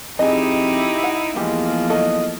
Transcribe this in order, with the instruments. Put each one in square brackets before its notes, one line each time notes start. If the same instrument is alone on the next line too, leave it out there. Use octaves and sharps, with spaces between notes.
[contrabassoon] F2 [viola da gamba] D#4 E4 [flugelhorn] G4 [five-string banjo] G#4 D#5
[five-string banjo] F#5
[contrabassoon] E2 [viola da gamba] F3 A#3 [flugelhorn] G#3 [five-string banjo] G4
[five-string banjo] F#3 A4 [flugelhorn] D#5